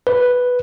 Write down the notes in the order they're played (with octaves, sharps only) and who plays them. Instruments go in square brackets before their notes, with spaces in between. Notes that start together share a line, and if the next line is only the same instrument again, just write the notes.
[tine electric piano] B4